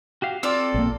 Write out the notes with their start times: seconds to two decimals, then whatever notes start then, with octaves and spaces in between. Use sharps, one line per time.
0.22 F#4 G4 F5
0.43 C4 F4 A4 D5 D6 E6
0.74 A#1 A#3